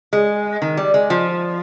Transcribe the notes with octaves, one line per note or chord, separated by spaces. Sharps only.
G#3
D#3
G3
G#3
F3